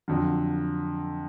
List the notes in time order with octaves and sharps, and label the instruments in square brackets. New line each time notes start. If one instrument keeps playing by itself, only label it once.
[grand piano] F2 D3 F#3